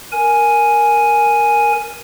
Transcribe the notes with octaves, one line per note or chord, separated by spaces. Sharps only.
A#4 G#5